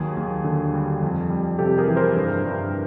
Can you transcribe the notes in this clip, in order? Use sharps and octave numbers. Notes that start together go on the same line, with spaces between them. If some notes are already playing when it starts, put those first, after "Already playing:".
Already playing: D#2 F#3 G#4
D#2
D3
G3
F2
G3
C3 G4 A4
G#4 A#4
E3
A#4 C5
G2
G2